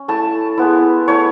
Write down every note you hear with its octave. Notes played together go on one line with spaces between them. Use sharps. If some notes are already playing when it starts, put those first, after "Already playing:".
Already playing: C#4
A3 E4 A5
G#3 B3 E4
A3 E4 C#5